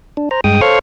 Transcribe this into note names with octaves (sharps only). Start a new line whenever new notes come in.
D4
C5 A#5
G2 G#3 G5 D#6
A4 C5 C#5 F5 C#6 F6